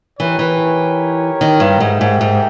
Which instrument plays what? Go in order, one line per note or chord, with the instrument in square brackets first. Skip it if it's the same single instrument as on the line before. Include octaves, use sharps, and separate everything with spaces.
[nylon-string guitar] E3 [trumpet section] D#4 G4 A#4 C#5
[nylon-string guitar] E3
D#3
G2
[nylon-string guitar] G#2 [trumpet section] D#4 G4 A#4 E5 G5
[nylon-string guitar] G#2
G#2